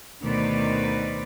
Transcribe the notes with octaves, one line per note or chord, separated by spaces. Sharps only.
D2 B2 D#3 B4 C5 D5